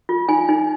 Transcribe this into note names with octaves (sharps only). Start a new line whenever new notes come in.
F4
D#4 G#5
D#4